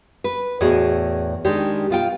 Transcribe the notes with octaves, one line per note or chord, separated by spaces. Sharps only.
B4
E2 A2 F#4 G#4 D#5
D#3 G#3 D4 G4
B2 F4 G5